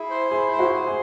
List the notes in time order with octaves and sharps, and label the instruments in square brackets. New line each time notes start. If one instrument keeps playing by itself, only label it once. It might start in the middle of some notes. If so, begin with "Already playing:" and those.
Already playing: [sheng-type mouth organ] E4 [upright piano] G#4
[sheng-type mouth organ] C5
[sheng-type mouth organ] E4 [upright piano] G#4
[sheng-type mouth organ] C5
[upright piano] F#4
[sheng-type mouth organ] C5
[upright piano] G#4